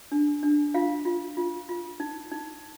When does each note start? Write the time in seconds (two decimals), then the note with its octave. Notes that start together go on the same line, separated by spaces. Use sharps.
0.12 D4
0.43 D4
0.74 F4 F5
1.05 F4
1.37 F4
1.69 F4
2.00 D#4
2.31 D#4